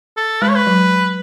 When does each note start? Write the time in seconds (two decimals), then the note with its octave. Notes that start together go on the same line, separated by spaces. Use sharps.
0.17 A4
0.42 G#3 B4
0.49 C#5
0.56 B4
0.67 F#3